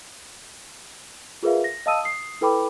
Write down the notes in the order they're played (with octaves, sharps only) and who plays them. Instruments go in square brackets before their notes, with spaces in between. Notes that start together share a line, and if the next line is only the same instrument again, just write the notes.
[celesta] F4 G#4 A#4 B4 E5 F5
A#6
D#5 F5 A5 D#6 E6 D#7
D#6 C7
E4 A4 B4 G5 B5 D6